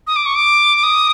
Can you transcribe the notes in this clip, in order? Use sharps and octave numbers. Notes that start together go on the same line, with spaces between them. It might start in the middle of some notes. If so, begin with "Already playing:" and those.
D#6
D6
C#6
D6
D#6